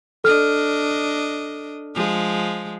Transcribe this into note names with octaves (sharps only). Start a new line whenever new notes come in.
D4 A4 D#5 F6
F3 G#3